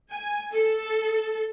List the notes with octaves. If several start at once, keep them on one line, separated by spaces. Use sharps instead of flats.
G#5
A4